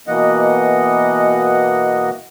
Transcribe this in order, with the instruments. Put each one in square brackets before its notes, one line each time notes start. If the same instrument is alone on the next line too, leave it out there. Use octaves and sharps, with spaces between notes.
[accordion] B2 E3 A#3 D#5 F#5